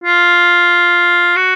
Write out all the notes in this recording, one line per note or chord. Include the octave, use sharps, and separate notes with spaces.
F4
F#4